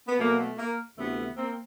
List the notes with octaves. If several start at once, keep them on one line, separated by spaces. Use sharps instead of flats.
B3
B2 F#3 A3 A#3
A3
A#3
D2 C3 E3 A3 B3
A#3 C4